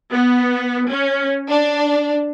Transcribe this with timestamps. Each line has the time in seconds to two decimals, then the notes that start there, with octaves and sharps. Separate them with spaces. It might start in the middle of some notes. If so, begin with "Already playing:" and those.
0.12 B3
0.90 C#4
1.49 D4